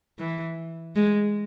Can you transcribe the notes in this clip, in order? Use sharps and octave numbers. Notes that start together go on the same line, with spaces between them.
E3
G#3